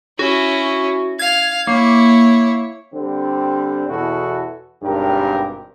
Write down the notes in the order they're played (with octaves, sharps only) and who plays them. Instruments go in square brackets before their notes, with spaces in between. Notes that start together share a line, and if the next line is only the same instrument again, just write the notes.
[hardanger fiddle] C#4 E4 [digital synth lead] F#4
[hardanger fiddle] F5 [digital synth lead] G#6
[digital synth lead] A#3 [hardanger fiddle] E4 C#5
[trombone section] D3 G3 C4
E2 B2 E4 F#4 A4
G#1 G2 B2 G4 A#4